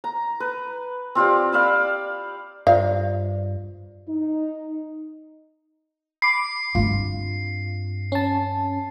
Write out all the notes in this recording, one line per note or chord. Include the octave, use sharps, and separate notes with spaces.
A#5
B4
C4 F4 G4 D5
D5 F5 B5 E6
G2 F4 C5 D5 F5
D#4
B5 D6 C7
G2 C4 F4
C#4 A5